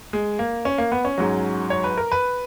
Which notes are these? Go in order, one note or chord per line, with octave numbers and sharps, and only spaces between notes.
G#3
A#3
C#4
A#3
B3
C#4
G#2 F#3
C#5
B4
A#4
B4